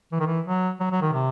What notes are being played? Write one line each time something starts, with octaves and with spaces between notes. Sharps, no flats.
E3
D#3
E3
F#3
F#3
F#3
D#3
C3